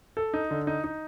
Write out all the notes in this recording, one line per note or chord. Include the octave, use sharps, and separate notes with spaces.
A4
D#4
D3
D#4
D#4